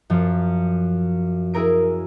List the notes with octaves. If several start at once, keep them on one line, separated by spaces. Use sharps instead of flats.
F#2 F3
E4 G#4 A#4 D7